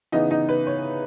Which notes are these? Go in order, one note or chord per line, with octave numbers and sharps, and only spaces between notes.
C#3 E3 B3 D#4 D#5
D#4 D#5
B4
C#5